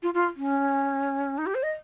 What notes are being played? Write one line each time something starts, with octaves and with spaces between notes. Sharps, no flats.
F4
F4
C#4
D#4
G4
C5
D#5